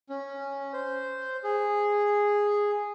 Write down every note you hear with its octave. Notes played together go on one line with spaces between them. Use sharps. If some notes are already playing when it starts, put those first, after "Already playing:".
C#4
C5
G#4